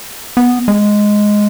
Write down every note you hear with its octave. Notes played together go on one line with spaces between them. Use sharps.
B3
G#3